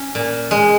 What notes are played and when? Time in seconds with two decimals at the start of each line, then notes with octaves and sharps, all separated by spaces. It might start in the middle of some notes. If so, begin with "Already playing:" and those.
Already playing: C#4
0.15 A#2
0.51 G#3